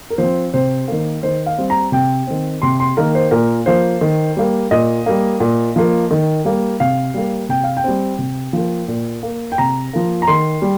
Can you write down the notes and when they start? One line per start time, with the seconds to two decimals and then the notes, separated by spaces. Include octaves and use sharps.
0.10 A#4
0.18 F3 C4 C5
0.54 C3 C5
0.88 D#3 A#3
1.23 D#3 C5
1.46 F5
1.58 G3 C4
1.70 A#5
1.92 C3 G5
2.27 D#3 C4
2.62 C3 C6
2.80 C6
2.97 D#3 A#3 A#4
3.15 C5
3.31 A#2 A#4
3.66 F3 A#3 C5
4.01 D#3
4.37 G3 A#3
4.71 A#2 D#5
5.06 G3 A#3
5.40 A#2
5.76 F3 A#3
6.11 D#3
6.45 G3 A#3
6.80 C3 F5
7.14 G3 A#3
7.49 C3 G5
7.64 F5
7.77 G5
7.84 G3 C4
8.18 C3
8.53 F3 A#3
8.88 A#2
9.23 A#3
9.52 G5
9.58 C3 A#5
9.93 F3 A#3
10.22 A#5
10.27 D#3 C6
10.62 G3